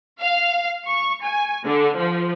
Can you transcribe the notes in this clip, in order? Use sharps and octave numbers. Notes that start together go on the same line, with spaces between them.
F5
C#6
G#5
D3
F3